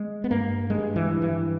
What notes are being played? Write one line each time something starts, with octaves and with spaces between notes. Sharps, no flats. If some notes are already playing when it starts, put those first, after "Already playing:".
Already playing: G#3
B3
G2 A#3
G2 G#3
E3
G2
E3